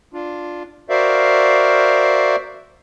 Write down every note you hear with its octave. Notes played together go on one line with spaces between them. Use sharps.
D4 F4
F#4 A#4 C5 D5 E5 F5